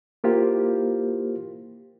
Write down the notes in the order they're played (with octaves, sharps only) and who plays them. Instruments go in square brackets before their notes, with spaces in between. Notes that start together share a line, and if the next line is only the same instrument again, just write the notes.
[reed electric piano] A#3 E4 F4 G4 A#4 C5